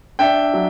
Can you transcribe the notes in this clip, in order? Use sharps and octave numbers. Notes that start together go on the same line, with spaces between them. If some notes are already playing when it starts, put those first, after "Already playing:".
D4 E5 G5
F#3